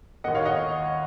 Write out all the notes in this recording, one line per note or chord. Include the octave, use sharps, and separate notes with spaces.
D#2 D#3 A#3 D#5 F#5
C#5 F5
D#5 F#5